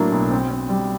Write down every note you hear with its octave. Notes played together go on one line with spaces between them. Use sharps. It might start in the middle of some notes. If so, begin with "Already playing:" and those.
Already playing: A2 F#3 A#3 D4
B1
C4
C4
G3